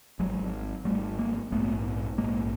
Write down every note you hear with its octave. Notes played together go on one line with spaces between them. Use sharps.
G#1 G#2 F#3 G#3
G#1 G#2 G3 A3
G#3 A#3
A#1 G#2 A3 B3
A#1 G#2 G#3 A#3